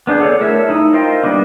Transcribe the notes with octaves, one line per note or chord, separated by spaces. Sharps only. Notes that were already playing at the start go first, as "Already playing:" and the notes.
B3 D4 G#4 G6
G#4 A4 C#5 D5
A3 E4 A#4 C#5 E5
D#4 E4
F4 A#4 C5 D#5 G5
G3 A#3 B3 D4